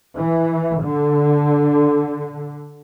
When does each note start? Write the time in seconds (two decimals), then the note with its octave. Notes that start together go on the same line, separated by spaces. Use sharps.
0.16 E3
0.83 D3